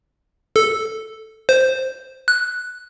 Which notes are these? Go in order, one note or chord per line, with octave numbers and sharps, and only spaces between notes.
A4
C5
F#6